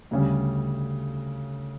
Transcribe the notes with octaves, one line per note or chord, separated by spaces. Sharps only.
D2 C#3 G3